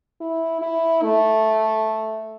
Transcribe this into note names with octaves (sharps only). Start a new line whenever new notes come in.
E4
E4
A3